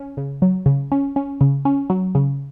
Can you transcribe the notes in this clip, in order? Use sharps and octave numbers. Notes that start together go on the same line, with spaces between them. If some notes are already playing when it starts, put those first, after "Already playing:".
Already playing: C#4
C#3
F#3
C#3
C#4
C#4
C#3
C#4
F#3
C#3